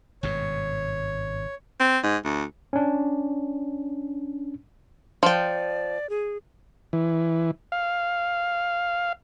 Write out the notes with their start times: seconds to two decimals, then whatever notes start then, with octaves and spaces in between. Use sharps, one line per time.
0.23 G#1 G2 B2 C#5
1.80 C4
2.03 G#2
2.25 D2
2.73 C#4 D4
5.23 F3 D5 G5
6.10 G#4
6.93 E3
7.72 F5